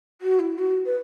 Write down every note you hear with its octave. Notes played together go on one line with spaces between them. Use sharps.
F#4
E4
F#4
B4